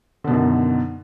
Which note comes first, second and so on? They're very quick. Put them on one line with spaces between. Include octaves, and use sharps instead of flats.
D3 B2 F#2 D#3